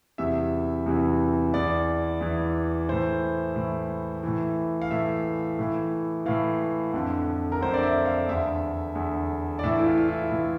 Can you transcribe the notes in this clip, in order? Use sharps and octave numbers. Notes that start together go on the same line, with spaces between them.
E2 C3 E3 E5
E2 C3 E3
E2 E3 D5
E2 E3
A2 E3 C5
A2 E3
A2 E3
F5
A2 E3 E5
A2 E3
A2 E3 F5
F2 D3
A#4
F2 D3 C5
D5
E5
F5
E2 D3 E5
E2 D3
D5
A2 E3 E5
E4
F4
F4
E4
A2 E3